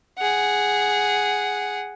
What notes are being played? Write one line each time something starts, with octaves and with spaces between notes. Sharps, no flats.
G#4 F#5